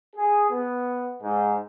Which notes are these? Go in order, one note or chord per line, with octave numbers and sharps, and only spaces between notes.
G#4
B3
G#2